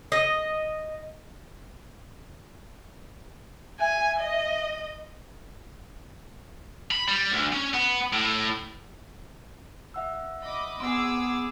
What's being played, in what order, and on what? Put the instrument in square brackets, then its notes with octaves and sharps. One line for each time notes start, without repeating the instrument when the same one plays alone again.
[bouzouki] D#5
[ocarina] E5 [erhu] G#5
[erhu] D#5
[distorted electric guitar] B5
G3
D2
C#4
B3
A2
[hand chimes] E5 F#5 E6
[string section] D#5 B5 D6
[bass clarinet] B3 [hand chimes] C4 C6 D7 [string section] G#4 D6 E6